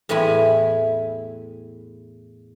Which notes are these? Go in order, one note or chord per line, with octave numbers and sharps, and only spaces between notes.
E2 A2 C4 E4 G#5 B5